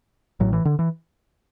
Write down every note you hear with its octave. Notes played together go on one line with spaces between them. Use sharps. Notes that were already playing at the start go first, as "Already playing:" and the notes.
A1 A2 F#3
E3
D3
E3